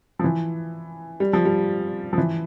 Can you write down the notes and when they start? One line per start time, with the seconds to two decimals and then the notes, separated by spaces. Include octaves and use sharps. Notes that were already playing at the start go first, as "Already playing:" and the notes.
0.19 F3
0.24 E3
1.20 G3
1.33 F3
1.45 G3
2.13 F3
2.18 E3